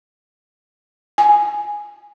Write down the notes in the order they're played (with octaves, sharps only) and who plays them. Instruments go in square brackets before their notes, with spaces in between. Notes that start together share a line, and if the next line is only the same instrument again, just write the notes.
[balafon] G#5